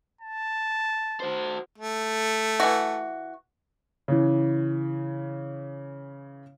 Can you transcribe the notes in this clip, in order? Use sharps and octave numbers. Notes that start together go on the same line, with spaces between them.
A5
F#4 C5
A3
E3 F#4
C#3 E3